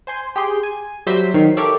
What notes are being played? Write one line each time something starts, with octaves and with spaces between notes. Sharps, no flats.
C5 G#5 C6
G4 G#4 C6
G#5
F#3 G3 C5 E5 B6
D#3 F#3 C7
G4 A4 A#4 C#5 D5 E5